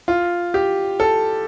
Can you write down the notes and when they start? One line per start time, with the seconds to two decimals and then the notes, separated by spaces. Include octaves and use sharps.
0.08 F4
0.54 G4
1.00 A4